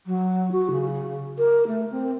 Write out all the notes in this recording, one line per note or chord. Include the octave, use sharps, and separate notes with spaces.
F#3
F#4
C#3
A#4
A3
C4